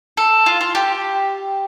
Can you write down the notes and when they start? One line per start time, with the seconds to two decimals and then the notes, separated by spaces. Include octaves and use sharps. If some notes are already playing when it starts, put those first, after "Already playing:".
0.17 A4
0.46 F4
0.61 F4
0.75 G4